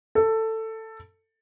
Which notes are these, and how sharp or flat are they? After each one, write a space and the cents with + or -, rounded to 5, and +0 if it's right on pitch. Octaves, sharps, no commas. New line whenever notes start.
A4 +15